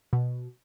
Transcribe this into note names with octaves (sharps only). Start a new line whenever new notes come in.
B2